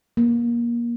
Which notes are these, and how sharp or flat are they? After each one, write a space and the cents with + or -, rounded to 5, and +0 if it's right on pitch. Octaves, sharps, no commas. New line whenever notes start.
A#3 +25